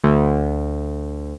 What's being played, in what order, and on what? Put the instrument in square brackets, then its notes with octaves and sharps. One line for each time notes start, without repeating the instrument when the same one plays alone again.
[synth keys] D2